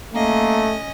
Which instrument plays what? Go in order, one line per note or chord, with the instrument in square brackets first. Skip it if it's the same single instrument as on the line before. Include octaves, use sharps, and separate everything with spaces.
[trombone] A3 [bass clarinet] A#3 [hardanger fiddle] C#4 D#5